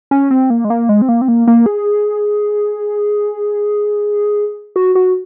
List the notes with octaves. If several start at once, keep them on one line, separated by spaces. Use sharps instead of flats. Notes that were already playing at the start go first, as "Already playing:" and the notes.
C#4
C4
A#3
G#3
A#3
G#3
C4
A#3
C4
A#3
A#3
G#4
F#4
F#4